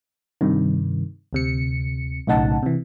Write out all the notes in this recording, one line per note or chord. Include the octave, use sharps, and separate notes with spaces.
G2 C3 D#3
D2 C3 C#7
B1 A2 C#3 D#4 F#5 A5
C3 E3